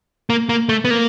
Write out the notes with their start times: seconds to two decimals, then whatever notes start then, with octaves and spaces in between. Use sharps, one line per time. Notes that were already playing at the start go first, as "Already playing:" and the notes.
0.30 A#3
0.49 A#3
0.69 A3
0.85 B3
0.90 A#3